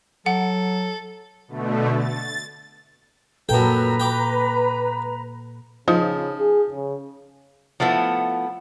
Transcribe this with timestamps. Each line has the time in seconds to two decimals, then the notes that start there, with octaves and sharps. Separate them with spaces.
0.26 F#3 A4 F#5
1.48 B2 D3 A3
1.96 A6
3.49 F#2 A#2 A4 B4 G5 A#5
4.00 G5 D6
5.88 C#3 F3 D#4 F4 C5
6.39 G#4
6.70 C#3
7.80 F3 A3 B3 E4